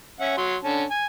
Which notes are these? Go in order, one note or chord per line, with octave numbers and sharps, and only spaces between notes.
C#4 E5 F#5
F#3 C6
D3 C#4 A5
G#5